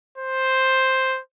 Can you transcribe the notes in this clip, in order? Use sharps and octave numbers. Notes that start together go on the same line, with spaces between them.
C5